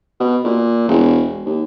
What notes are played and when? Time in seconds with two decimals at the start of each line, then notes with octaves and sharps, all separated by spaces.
0.20 B2
0.44 A#2
0.88 E1
1.46 D#2